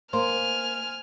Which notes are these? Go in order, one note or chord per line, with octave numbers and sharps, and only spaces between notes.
A#3 C5 G#5 F6